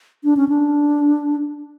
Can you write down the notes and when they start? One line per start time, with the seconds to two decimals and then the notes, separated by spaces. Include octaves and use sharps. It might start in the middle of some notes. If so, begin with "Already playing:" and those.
0.24 D4
0.37 C#4
0.49 D4